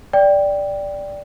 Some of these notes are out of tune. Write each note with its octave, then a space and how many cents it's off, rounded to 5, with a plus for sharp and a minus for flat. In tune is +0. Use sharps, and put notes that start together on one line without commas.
D5 -5 G5 +0